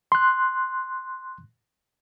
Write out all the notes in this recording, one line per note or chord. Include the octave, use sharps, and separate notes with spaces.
C6 F#6